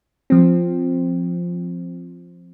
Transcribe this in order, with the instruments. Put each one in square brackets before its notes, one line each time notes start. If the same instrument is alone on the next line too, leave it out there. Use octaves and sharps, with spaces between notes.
[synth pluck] F3 C4